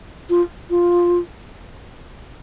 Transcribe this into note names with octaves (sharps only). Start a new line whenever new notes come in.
F4
F4